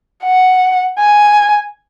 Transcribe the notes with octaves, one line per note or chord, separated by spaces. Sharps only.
F#5
G#5